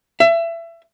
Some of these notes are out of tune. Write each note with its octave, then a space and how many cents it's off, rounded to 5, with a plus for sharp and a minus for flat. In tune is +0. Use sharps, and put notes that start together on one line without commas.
E5 +25